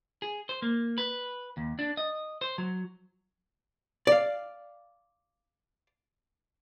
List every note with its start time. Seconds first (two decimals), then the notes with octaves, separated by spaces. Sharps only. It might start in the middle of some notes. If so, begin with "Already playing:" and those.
0.22 G#4
0.49 C5
0.62 A#3
0.98 B4
1.57 D#2
1.79 D4
1.97 D#5
2.41 C5
2.58 F#3
4.07 D5 F5